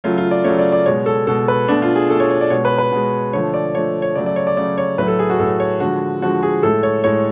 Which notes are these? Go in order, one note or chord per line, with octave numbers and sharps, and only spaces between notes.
C#3 F#3 A3 F4
F4
D5
C#3 F#3 A3 C#5
D5
D5
B2 G#3 C#5
A4
B2 G#3 A4
B4
B2 A3 D4
F4
G#4
B2 A3 A4
C#5
C#5
D5
B2 G#3 C#5
B4
B4
B2 G#3
D3 F3 A3 C#5
D5
D3 F3 A3 C#5
C#5
C#3 F#3 A3 D5
D5
C#5
D5
C#3 F#3 A3 D5
C#5
A2 F#3 A3 B4
A4
G#4
F#4
A2 F#3 A3 A4
C#5
D3 F3 G#3 F#4
D3 F3 G#3 F#4
G#4
A2 G#3 A4
C#5
A2 G#3 C#5